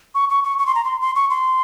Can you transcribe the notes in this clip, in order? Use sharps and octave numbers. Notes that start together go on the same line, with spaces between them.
C#6
C#6
C#6
C#6
C6
A#5
C6
C6
C#6
C6